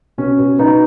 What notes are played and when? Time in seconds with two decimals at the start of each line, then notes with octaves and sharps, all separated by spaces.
0.18 B2 C#4
0.39 B2
0.59 B2 B3 D#4